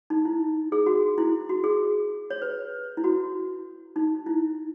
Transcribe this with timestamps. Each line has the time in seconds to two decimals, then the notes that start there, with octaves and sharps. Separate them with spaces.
0.10 D#4
0.25 E4
0.72 G#4
0.86 F#4
1.18 E4
1.49 F#4
1.64 G#4
2.30 C#5
2.42 B4
2.97 E4
3.04 F#4
3.96 D#4
4.26 E4